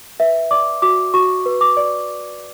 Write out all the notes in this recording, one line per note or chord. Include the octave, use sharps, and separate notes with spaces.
B4 E5
D5 D6
F#4 D6
F#4 C#6
B4
D6
D5